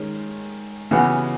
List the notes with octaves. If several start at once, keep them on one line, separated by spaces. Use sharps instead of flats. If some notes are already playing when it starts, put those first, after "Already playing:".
Already playing: D#3 G#3 C#4
C#3 E3 B3 F#4